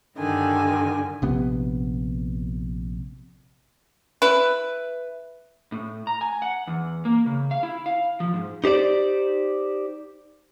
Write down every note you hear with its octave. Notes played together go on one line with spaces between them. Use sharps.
G2 D3 D#3 G#5
A#1 C3 B3
E4 B4
A2
A#5
G#5
F#5
E2
A#3
C#3
F5
E4
F5
F3
G#2
D#4 G4 C5 D5